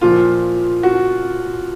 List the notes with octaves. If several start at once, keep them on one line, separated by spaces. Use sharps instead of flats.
A#2 F3 F4
F#4